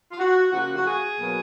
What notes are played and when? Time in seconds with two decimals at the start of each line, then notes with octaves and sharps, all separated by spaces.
0.11 F4
0.18 F#4
0.51 C#3 F3 A#3 F#4
0.76 F#4
0.86 G#4
1.19 B2 F#3 A#3